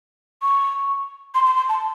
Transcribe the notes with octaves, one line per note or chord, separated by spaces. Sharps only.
C#6
C6
C6
C6
A5